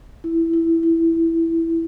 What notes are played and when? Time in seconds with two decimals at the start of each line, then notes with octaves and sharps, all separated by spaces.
0.24 E4
0.53 E4
0.83 E4